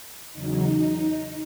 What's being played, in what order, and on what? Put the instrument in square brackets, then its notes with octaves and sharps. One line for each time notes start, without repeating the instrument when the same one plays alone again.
[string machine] E2 C#3 F#3 D#4